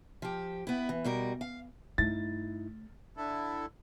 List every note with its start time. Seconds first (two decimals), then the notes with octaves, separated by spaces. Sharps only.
0.22 F3 G4
0.67 B3 E4
0.89 E3
1.05 B2 G3 A#4
1.41 F5
1.98 G2 A3 D#4 E4 A6
3.17 D3 E4 A4